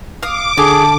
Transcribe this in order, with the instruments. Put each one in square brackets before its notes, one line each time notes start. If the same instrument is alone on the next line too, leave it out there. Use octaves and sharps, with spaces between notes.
[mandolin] F5 D#6 [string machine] D6
[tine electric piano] D3 [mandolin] C#4 A5 [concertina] G#4